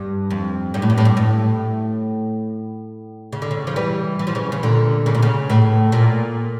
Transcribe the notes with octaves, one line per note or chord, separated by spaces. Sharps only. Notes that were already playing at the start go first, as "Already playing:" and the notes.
Already playing: G2
F2
G2
A2
G2
A2
G2
A2
C#3
D3
C#3
F3
E3 G3
E3
F3
C#3 E3
C#3
A#2 D3
C#3
A#2
C#3
A2
A#2